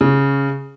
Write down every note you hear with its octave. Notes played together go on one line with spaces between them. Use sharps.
C#3